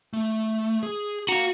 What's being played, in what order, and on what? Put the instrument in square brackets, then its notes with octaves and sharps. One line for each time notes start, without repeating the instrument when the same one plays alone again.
[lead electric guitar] A3
G#4
[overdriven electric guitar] F#4 [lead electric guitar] F5 A#5